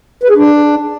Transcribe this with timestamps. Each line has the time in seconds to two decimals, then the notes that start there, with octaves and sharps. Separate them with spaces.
0.23 B4
0.30 G#4
0.36 D4